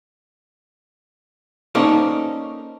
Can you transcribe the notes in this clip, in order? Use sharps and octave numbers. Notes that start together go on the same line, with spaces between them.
A#3 C#4 D#4 A4 C5 D5